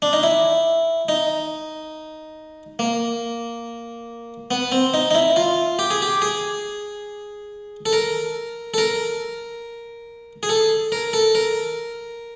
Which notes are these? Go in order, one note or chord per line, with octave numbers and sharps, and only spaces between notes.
D4
D#4
E4
D#4
A#3
B3
C4
D#4
D#4
E4
F4
G4
G#4
G4
G#4
A4
A#4
A4
A#4
G#4
A4
A#4
A4
A#4